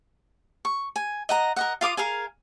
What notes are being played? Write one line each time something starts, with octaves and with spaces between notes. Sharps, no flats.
C#6
G#5
D#5 F#5 A#5
A#4 D#5 F#5
F4 F5 D6 D#6
G#4 A#4 F5 G#5